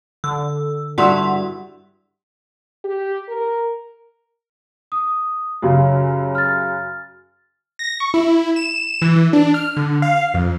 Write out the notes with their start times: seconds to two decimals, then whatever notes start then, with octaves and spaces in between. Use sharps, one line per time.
0.24 D3 E6
0.98 G2 E4 F#4 F#5 C6 E6
2.84 G4
3.29 A#4
4.92 D#6
5.62 F#2 C#3 G4 C#5
6.35 F6 A6
7.79 A#6
8.00 C#6
8.14 E4
8.56 E7
9.02 E3
9.16 E3
9.33 D4
9.54 F6
9.77 D3
10.02 F5
10.34 F2